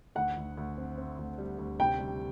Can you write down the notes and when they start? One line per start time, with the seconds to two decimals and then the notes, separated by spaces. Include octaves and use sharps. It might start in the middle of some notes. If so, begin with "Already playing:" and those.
0.15 D2 F#5
0.37 D2
0.57 D2
0.78 C4
0.98 C4
1.19 D2
1.38 G3
1.58 D2
1.79 C3 G5
1.99 G3